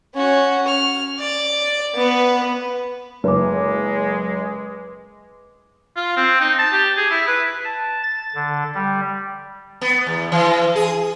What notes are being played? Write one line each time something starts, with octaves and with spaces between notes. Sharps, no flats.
C#4 F#4
F6
D5
B3 B4
F#1 G#3 B4 D6
F4
C4
D#4
A5
G4
G#4
E4
B4
A5
A6
D3
G3
B3
E2
E3
G#4